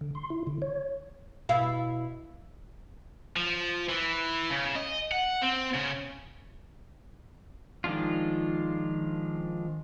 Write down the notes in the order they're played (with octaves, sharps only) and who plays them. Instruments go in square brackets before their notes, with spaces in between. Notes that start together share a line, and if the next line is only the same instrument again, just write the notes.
[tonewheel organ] D3
C6
E4
D3
C#5
[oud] B2 E4 F5
[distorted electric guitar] F3
E3
C#3
D#5
F#5
C4
C#3
[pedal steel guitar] D#3 F3 G#3 D4 F4